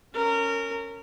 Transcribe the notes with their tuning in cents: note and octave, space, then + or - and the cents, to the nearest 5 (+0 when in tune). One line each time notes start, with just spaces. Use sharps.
C#4 +0 A#4 -25